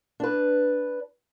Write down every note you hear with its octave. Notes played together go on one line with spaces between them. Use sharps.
D4 B4